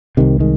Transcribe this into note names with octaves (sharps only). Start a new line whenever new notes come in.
C2 C3 D#3
D#3 G#3